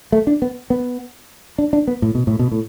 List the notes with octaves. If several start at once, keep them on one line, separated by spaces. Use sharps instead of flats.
A3
D4
B3
B3
D4
D4
B3
A2
B2
A2
B2
A2